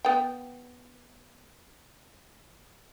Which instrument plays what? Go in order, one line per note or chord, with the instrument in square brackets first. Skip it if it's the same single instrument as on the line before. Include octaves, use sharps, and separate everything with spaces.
[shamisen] B3 G5